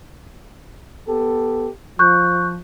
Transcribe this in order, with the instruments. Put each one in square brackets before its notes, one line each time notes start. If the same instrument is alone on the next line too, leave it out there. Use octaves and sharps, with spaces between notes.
[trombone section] B3 G4 A4
[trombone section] F3 [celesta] C#6 F#6 G6